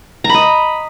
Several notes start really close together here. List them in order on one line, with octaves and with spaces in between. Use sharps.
A#5 B5 D#5